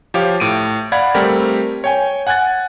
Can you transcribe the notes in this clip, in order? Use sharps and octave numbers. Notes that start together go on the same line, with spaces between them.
F3 G4 C#5 F5 D6
A2 D7 D#7
D5 F5 F#5 B5 G#6
G3 A3 C4 G4 A#4
C#5 G5 G#5
F#5 G#5 F#6 G#6 A6